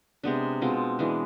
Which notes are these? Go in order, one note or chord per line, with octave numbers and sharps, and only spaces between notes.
C3 G#3 B3 D4
B2 G#3 C4 F4
E3 G#3 D4